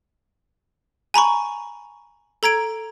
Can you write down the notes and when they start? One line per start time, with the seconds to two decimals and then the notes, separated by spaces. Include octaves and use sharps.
1.14 G#5 A#5 B5 C#6
2.43 A4 A#5 G#6 D7